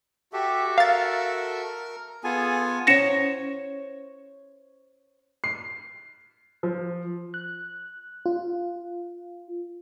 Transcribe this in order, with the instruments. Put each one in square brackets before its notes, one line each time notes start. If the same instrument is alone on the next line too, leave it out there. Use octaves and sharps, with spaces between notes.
[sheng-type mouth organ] F#4 A4 E5 [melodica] G4
[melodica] A#4 [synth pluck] F5 A6
[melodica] B3 F4 G#5 [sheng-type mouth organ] G#4 A4
[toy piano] C#4 E4 F#5 [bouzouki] C5 C#5 [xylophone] A#6 C#7 E7
[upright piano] C7
F3
[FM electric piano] F#6
F4